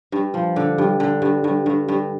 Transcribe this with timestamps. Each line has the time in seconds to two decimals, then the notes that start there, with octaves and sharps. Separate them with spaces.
0.12 G2
0.34 F3
0.56 D3
0.78 G2
1.00 D3
1.22 G2
1.44 G2
1.66 G2
1.88 G2